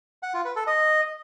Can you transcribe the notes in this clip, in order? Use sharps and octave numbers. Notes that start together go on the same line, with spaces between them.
F#5
F4
B4
A4
D#5